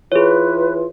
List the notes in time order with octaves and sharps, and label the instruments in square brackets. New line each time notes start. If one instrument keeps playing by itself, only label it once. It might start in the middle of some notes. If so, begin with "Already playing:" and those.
[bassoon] E3 [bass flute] F4 [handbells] G#4 C#5 [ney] B4